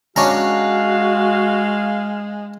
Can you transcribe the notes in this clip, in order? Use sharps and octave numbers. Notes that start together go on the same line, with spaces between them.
G#3 C#4 D4 F#4 F5 A#5